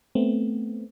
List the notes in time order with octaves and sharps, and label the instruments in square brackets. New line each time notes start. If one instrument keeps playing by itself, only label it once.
[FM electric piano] A3 B3 C4